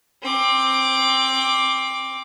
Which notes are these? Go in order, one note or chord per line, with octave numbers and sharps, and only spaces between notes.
C4 D6